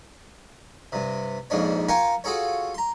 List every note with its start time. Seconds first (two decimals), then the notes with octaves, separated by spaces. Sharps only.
0.92 G2 C3
1.50 A#1 F2 G#2 D4 C#5
1.89 F4 A#4 F5 G5 G#5 C#6
2.24 F4 F#4 G#4 A4 C#5
2.74 A#5 C6